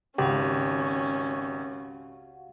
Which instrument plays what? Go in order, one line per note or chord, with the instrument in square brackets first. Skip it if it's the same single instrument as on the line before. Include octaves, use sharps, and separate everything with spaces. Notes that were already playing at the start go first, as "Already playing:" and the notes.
[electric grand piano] G#1 [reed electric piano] C#2 G4 [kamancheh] C#4 [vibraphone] F#4 F5 F#5